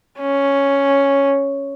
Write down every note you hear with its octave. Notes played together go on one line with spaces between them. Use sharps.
C#4